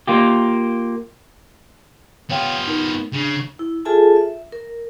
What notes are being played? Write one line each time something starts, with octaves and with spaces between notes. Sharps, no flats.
A#3 F4 G4
B3 F4 C#5 F5 G5
D#4 A#4
C#3 D4 C7
E4
F4 G#4 A4 E5 G#5 A5
E5
A#4